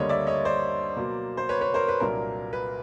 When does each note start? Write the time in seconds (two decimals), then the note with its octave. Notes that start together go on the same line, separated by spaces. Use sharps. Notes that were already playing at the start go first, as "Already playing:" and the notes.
Already playing: D2 D3 G3 A#3 D4 C#5 D#5
0.09 D5 E5
0.27 C#5 D#5
0.45 C5 D5
0.96 B2 F#3 A#3
1.37 C5
1.49 B4 C#5
1.61 B4 C#5
1.74 A#4 C5
1.88 B4
2.00 C2 A#2 F#3 A#3 D4 A#4
2.53 B4